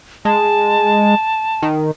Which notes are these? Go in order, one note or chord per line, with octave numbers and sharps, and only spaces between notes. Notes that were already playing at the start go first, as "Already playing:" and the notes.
G#3 A5
D#3